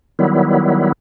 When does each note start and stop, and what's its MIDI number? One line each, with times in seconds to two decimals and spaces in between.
0.19 0.92 51
0.19 0.92 54
0.19 0.92 55
0.19 0.92 59
0.19 0.92 64